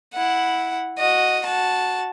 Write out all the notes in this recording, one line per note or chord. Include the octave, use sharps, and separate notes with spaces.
E4 F#5
F#4 D#5
F#4 A5